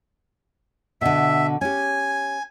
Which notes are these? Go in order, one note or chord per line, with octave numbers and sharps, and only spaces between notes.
B2 D3 E5
C#4 G4 G#5